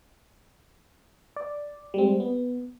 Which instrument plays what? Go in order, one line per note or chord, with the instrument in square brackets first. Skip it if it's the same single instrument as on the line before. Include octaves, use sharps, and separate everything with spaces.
[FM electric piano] D5
G3 G#3 C4
B3